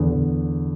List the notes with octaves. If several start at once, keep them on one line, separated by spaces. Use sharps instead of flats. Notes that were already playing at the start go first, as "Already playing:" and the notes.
Already playing: E2 D3
E2